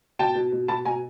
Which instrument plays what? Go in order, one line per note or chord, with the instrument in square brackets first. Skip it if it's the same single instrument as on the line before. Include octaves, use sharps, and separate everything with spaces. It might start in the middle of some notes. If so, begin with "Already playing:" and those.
[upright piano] B2 G5 A5
B2
B2
B2 A5 B5
B2 G#5 A#5